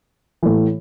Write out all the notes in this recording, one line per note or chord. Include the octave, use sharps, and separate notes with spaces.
A2 E3